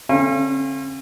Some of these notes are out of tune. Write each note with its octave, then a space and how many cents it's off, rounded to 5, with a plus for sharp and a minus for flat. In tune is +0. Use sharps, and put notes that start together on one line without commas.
D3 -25 C#4 -45 F5 -25